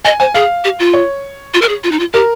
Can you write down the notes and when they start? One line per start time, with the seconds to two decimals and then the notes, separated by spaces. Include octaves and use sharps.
0.05 D#5 G#5
0.20 C5 G#5
0.34 G#4 F5
0.64 G4
0.79 F4
0.94 C#5
1.54 F4
1.62 A#4
1.69 G#4
1.84 F4
1.91 D#4
1.99 F4
2.13 G4 A#4